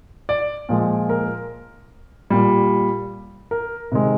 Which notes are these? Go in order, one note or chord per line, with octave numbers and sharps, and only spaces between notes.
D5
A#2 F3 G#3
A#4
A#2 G3
A#4
C3 D#3 G#3